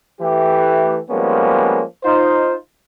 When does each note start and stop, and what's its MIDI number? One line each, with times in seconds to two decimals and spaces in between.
0.21 0.98 52
0.21 0.98 57
0.21 0.98 67
1.10 1.83 53
1.10 1.83 55
1.10 1.83 56
1.10 1.83 58
1.10 1.83 59
1.10 1.83 61
2.04 2.54 63
2.04 2.54 65
2.04 2.54 72